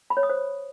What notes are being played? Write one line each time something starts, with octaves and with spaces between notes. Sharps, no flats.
B5
C#5
D#6
C5